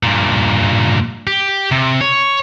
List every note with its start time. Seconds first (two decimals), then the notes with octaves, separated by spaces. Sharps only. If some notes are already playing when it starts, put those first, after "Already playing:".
0.03 G2 A#2
1.27 G4
1.72 C3
2.01 C#5